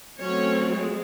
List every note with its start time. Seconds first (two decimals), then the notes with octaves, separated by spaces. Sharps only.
0.22 F#3 A3 C4 C#4 C#5
0.74 G#3